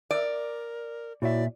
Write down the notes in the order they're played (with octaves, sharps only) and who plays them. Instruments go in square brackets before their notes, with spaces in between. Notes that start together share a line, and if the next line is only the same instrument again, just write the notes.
[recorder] A#4 [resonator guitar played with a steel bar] D5
[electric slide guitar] A#2 E5 [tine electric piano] E4 F#4 C#5 [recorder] D5